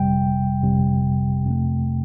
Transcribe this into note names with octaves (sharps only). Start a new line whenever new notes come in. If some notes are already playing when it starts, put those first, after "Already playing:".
Already playing: G1 F2 C3 G3 G5
G1 F2 C3 G3
F2 C3 A3